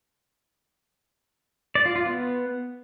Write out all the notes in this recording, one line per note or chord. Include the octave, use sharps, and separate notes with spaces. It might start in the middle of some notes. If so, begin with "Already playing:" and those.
D5
F4
F4
B3